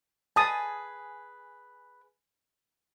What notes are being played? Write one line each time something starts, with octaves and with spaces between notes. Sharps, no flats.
G#4 B4 G#5 A5 D#6